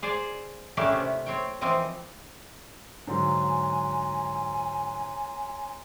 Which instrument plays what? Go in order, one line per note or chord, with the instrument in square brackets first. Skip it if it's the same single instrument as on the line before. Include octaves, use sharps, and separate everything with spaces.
[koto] G#4 C5 D5
A3 A#3 C#4 D4 E4 G4
C3
C4 C#5 G5
E3 F3 C4 A#4 D#5
[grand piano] G#2 D3 F#3 [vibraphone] C#5 A#5 C6 [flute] G#5